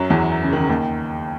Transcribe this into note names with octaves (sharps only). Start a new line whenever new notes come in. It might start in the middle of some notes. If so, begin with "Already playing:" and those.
Already playing: F#2 F#3
E2 E3
C#3
D#3
C#3
D#2 D#3